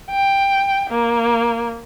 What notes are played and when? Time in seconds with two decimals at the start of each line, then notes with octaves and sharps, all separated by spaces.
0.12 G5
0.90 A#3